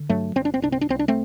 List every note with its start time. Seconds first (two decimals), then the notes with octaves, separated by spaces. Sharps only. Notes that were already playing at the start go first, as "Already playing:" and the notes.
Already playing: D3
0.09 G2 F#3 A3
0.36 G1 C4
0.45 D4
0.54 C4
0.62 C2 D4
0.72 C4
0.81 D4
0.89 C2 C4
0.99 D4
1.08 A3 C4